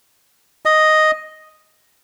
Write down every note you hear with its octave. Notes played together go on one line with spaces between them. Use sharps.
D#5